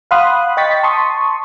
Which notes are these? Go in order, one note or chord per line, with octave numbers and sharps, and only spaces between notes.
F5 F#5 B5 C6 D#6 F#6
D#5 G5 C#6 A6 B6
A5 C6 C#6 D#6